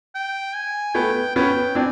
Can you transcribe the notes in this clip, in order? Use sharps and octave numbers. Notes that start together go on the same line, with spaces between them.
G5
G#5
A3 B3 G5
B3 C#4 G5
C4 D4 G#5